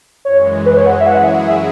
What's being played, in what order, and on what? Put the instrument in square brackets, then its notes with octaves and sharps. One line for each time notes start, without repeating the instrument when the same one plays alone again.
[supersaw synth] F#2 E3 G#3 [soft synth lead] C#5
[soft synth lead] B4
C#5
F#5
E5
[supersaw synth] F#2 F#3 E4 G#4 [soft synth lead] F#5
[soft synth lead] E5